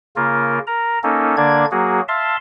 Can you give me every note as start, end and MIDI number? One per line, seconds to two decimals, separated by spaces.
0.16 0.59 49
0.16 0.59 58
0.16 0.59 65
0.16 0.59 70
0.67 0.99 70
0.67 0.99 82
1.03 1.36 58
1.03 1.36 61
1.03 1.36 63
1.03 1.36 69
1.37 1.65 50
1.37 1.65 58
1.37 1.65 62
1.37 1.65 74
1.37 1.65 92
1.71 2.01 54
1.71 2.01 58
1.71 2.01 66
1.71 2.01 68
2.08 2.36 76
2.08 2.36 77
2.08 2.36 81
2.08 2.36 84